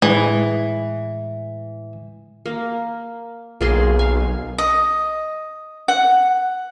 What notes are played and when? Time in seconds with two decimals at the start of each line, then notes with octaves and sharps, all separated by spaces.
0.02 A2 E3 G#3
2.46 A#3
3.61 B1 A#3 G#4 C6
3.99 F5 G#5
4.58 D#5
5.88 F#5